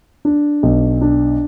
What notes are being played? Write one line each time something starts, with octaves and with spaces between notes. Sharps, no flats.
D4
B1
D4